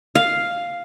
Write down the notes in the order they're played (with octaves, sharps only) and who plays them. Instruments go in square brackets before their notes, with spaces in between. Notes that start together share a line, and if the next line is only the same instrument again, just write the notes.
[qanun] F5